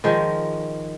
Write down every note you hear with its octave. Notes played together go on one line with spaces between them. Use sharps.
D#3 F3 G#3